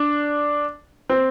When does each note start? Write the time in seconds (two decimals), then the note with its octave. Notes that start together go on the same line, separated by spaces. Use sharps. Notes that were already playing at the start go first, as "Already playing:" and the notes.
Already playing: D4
1.09 C4